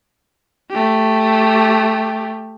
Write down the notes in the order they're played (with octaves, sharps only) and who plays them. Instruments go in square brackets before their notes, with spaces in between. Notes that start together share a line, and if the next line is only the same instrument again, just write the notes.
[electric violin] A3 G4